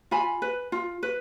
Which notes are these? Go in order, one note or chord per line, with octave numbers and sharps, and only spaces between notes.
F4 G#5 B5
B4
F4
B4